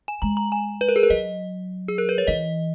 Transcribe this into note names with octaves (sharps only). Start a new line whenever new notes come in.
G#5
G#3 A#5
A#5
G#5
B4
A#4
G#4
A#4
F#3 D#5
G#4
A#4
B4
C#5
E3 D#5